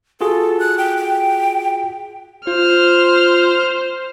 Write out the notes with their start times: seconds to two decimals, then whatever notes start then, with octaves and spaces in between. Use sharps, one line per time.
0.21 F4 F#4 G#4 A4
0.60 F#6
0.78 G5
0.97 G5
2.47 F4 C5 F6